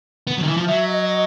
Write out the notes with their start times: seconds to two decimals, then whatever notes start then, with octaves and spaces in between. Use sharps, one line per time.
0.27 B3
0.38 F#3
0.43 D#3
0.48 E3
0.57 F3
0.67 F#3 E5
0.88 D#5
1.08 D#5